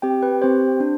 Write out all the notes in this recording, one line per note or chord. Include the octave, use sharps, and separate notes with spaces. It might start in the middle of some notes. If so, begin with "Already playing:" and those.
C4 G4 G5
B4
C4 G4 C5
D4